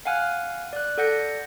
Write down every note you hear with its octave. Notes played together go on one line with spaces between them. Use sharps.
F5 F#5 G#5 F6 F#6
D5 F#6
A4 D5 F#5 G6 A#6 C#7